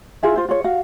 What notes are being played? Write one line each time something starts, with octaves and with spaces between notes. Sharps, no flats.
E4 F4 G#4 E5
F4 C5
F4 G#4 C#5
F#4 F5